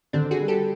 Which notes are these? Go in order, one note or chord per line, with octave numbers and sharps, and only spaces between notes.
D3 C4 D4
F#4 G#4
G3
G4 A4